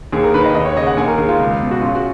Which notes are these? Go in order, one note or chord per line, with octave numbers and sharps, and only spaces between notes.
D#2 G#4
A#4
D#3 B4
D#5
D#2 D#5
C#5
C#3 D#5
F#5
D#2 G#5
A#4
D#3 G#4
F4
C#2
B2
F#4
F#2 F4
F#4